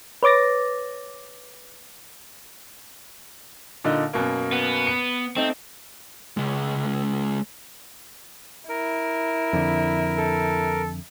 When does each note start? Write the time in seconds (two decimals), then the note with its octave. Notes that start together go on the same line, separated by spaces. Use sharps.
0.23 B4 C#5 D6 A6 A#6
3.84 A#2 D3 D#4
4.13 F#2 B2 A#3
4.52 B3
4.87 C#7
5.36 A3 C4 D#4
6.37 C#2 G#3
8.69 E4 A#4
9.53 F2 D3
10.18 A4